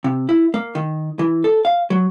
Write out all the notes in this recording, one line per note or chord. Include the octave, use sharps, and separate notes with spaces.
C3
E4
A#3
D#3
E3
A4
F5
F#3